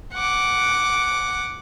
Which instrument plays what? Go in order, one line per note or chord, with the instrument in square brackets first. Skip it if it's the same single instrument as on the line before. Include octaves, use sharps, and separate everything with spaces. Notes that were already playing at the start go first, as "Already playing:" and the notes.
[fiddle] F#5 D6